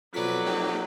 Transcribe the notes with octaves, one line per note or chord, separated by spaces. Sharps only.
F2 B2 F#3 B4 D5 B6
A#3 D#4 G4